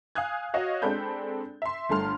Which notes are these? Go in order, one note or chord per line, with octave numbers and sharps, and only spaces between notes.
F5 G#5 D#6 F#6 G#6
F#4 C#5 D#5 F5
G#3 C4 D4 A4 B5 G6
E5 C6
G1 G2 A3 A5 C6 F6